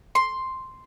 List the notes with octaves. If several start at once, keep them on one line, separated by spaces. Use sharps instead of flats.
C6